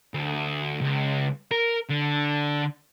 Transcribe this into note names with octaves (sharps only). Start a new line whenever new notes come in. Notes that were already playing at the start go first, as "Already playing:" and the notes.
D2
C#2
A#4
D3